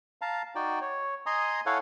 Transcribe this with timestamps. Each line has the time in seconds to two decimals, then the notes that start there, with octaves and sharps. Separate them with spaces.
0.22 F5 A5 A#5
0.55 D#4 F#4 D5 G5
0.81 C#5
1.26 D#5 G#5 A#5 C6 D#6
1.66 E4 A4 C#5 F5 F#5 G#5